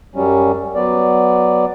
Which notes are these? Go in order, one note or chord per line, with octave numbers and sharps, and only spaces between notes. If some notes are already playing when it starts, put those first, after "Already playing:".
F#2 F#3 G3 C#4
F#3 B3 D5